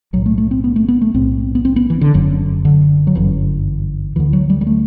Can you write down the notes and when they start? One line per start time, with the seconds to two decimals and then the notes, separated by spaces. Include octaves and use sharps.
0.13 B1 A2 F#3
0.26 A3
0.38 A3
0.51 C4
0.64 B3
0.76 A3
0.88 B3
1.01 A3
1.14 B1 A2 C4
1.55 B3
1.65 C4
1.76 B3
1.90 E3
2.01 D3
2.14 F#1 F#2 D3 F#3
2.65 D3
3.07 F#3
3.15 G1 F#2 D3 E3
4.16 D2 D3 E3
4.33 F#3
4.50 G3
4.61 G3
4.67 A3